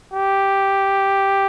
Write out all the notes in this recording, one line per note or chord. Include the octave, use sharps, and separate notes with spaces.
G4